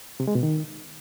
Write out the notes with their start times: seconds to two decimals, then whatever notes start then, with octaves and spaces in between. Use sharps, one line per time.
0.20 C3
0.27 G#3
0.35 B2
0.43 D#3